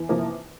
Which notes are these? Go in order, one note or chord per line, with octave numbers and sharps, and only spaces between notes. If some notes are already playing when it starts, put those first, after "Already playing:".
Already playing: E2
C3 F3 A#3